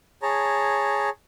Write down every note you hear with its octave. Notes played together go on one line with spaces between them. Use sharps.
G#4 C#5 A5 A#5